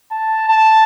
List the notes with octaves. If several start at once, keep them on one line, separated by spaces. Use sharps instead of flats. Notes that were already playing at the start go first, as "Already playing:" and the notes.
A5
A5